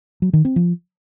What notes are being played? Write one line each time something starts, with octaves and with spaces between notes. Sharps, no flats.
F#3
D#3
C4
F3